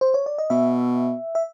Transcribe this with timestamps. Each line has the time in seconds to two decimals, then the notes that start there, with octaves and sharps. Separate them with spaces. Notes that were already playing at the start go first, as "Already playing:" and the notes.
0.01 C5
0.14 C#5
0.26 D5
0.38 D#5
0.50 B2 E5
1.35 E5